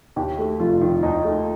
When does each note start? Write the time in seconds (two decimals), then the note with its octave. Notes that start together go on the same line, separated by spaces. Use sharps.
0.16 D#2 G4
0.39 A3
0.59 F1 F4
0.81 D#3
1.03 D#2 D#4
1.24 A3